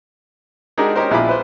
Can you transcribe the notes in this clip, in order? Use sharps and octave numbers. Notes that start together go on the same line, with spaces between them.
G#3 D4 D#4 F#4 G4 A#4
C#4 D#4 G4 A#4 C5
A#1 E4 F4 G#5 B5 D6
B4 C5